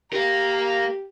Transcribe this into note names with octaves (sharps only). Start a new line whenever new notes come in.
G4 A#4 F5 A#5